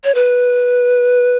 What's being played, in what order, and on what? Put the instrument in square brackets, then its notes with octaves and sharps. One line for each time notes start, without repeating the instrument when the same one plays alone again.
[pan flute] C#5
B4